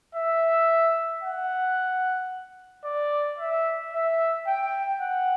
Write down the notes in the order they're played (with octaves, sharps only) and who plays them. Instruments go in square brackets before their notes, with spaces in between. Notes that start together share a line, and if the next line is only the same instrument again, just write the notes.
[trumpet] E5
F#5
D5
E5
E5
G5
F#5